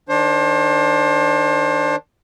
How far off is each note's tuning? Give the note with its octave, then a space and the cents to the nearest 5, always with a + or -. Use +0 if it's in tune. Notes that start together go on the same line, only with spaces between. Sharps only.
D#3 +0 D4 +0 C5 +35